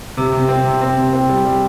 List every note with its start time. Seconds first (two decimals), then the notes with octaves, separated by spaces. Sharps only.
0.17 C3
0.33 C3
0.48 C4
0.65 C3
0.81 C4
0.98 C3
1.13 C4
1.29 G3
1.45 G3